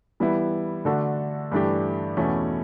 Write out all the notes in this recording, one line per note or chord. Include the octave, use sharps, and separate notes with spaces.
E3 G3 B3 E4
D3 A3 D4 F#4 A4
G2 E3 A3 D4 G4
E2 B2 A3 C#4 F#4